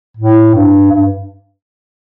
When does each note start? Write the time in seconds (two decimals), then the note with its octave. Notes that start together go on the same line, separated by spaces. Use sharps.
0.17 A2
0.54 G2
0.92 G2